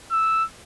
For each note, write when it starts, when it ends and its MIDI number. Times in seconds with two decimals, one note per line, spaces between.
0.11 0.44 88